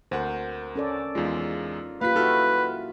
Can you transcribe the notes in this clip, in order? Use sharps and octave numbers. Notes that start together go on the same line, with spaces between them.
D2 A#4 C5 F#5
C#4 A4 D5
E2 G#3 D#4 F4
A#3 F4 G4 B4 F5 B6
E4 F#4 A4 F6